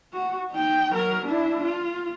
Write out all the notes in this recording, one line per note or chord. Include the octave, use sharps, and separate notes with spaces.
F#4
D#4 G5
F#3 A#4
D4 E4
F4